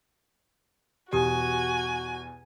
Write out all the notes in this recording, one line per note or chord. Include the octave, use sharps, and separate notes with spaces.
E2 B2 F#4 G4 G#5 D#6